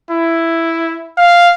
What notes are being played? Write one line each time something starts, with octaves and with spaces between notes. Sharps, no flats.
E4
F5